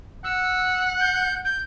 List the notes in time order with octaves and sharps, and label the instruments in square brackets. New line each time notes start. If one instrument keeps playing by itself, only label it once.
[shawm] F#5 [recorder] E6
[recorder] G6
G6